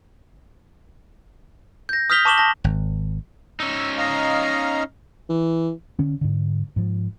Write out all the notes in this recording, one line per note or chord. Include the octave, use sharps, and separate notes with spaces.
G6 A#6
D#6 F6 G6 B6 F7 G7
A5 C#6 D6 E7 F#7 G7
A5 A#6
G#1
C#4 D#4 E6
D#5 F5 A#5
E3
D3 C#4
G#2 D3
G#2 F3